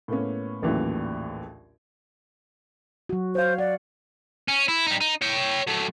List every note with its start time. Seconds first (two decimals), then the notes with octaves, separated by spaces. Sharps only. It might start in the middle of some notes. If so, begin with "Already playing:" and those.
0.08 A2 A#3 B3 C#4
0.62 A#1 D#2 A2 C#3 E3 F#3
3.09 F#3 F#4
3.35 C5 C#5 F5
3.58 D5 F#5
4.48 C#4
4.68 E4
4.87 G3 D#4
5.00 D#4
5.22 C#5 G5
5.67 F#3 A3